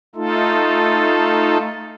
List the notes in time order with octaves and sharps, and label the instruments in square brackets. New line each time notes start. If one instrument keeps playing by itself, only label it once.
[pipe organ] A3 D#4 F4 A4